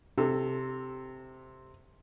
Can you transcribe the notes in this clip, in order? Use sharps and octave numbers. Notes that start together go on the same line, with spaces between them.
C3 A4